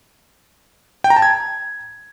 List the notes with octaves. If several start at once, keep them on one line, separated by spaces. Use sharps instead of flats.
G5
A#5
A5
G#6